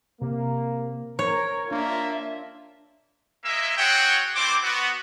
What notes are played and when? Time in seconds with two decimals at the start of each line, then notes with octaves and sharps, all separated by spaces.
0.21 C3 A#3
1.19 A#4 C#5
1.71 A#3 D4 F4 E5
3.45 G#3 A#3 D#5 E5
3.78 C4 F#4 G#4 C#5 F#5 G5
4.35 A3 C4 E4 C5 D6
4.64 B3 F#4